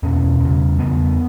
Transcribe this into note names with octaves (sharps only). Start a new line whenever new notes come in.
E2 B2 C#4
E2 C#3
E2 C#3 B3